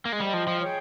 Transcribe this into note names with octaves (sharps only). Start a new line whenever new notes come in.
A#3
G#3
G3 C5 D#5 G5
F3
F3
G#4 C#5 G5